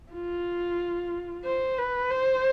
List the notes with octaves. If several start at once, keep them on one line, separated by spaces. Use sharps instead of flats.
F4
C5
B4
C5